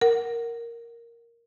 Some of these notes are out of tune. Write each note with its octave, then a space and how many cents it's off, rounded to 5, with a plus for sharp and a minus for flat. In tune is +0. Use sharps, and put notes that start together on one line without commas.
A#4 +0 F#5 +10